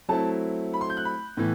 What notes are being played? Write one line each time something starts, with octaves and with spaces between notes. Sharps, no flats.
F#3 A3 C4 E4 A5
B5
C6
G6
F#6
B5
A2 E3 B3